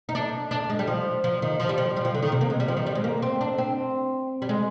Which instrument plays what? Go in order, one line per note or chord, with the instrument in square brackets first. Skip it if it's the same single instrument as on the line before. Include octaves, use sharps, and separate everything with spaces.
[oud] D#4
D4
D4
G#3
G3
F3
F3
D#3
F3
G3
F3
G3
F3
D3
D#3
C3
A#3
G#3
G3
F3
D#3
G3
G#3
A#3
C4
D4
C4
G3
G#3